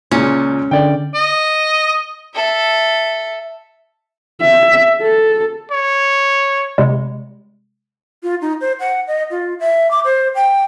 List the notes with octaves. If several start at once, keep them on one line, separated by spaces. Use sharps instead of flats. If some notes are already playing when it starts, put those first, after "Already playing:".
C#2 A#2 C#4
D3 D5 G5
D#5
A4 E5
E5
A4
C#5
C3 G3 G#3
F4
D#4
C5
F#5
D#5
F4
E5
D6
C5
G5